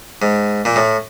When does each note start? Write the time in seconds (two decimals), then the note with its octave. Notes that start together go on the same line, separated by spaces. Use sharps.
0.22 G#2
0.65 A#2
0.76 A2